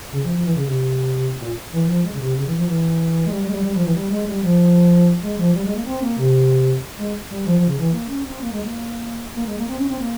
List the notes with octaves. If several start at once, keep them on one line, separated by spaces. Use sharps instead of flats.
C#3
F3
F3
E3
C#3
C3
A#2
E3
F3
G#3
C#3
C3
C#3
E3
F3
E3
G#3
G3
G3
G#3
G3
G3
F3
E3
G3
G#3
G3
F3
G#3
F3
G3
G#3
A#3
C4
A#3
C3
G#3
G3
F3
F3
C#3
E3
A#3
C#4
C4
A#3
G#3
A#3
A#3
G#3
A#3
C4
C#4
C4
A#3